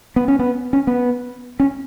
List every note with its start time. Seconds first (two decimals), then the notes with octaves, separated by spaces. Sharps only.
0.16 B3
0.28 C#4
0.39 B3
0.73 C#4
0.87 B3
1.60 C#4